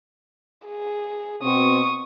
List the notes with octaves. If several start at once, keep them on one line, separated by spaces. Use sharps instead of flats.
G#4
B2 C4 C#6 D#6